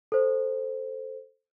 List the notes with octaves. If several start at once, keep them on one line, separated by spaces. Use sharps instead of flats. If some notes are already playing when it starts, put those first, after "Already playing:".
A4 C5